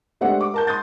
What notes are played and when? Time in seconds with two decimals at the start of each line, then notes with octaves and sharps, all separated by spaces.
0.21 G#3 A3 D4 G4 C5 F#5
0.41 D6
0.54 A#4 A5 G6
0.67 C6 D#6 G6 A6